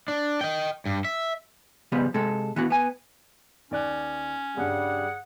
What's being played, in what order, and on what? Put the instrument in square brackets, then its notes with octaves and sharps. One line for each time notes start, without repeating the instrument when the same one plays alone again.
[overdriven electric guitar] D4
D#5 G5
G2
E5
[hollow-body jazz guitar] C#3 F3 G3 B3
C3 G#3 A4
E3 B3 F#4
B3 G#5
[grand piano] D#2 D5 F#6 [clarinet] C#4
[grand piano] G2 C#3 [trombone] G3 [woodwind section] G#4 F#5